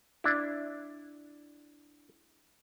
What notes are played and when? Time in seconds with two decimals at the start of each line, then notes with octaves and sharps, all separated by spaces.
0.24 D4 E4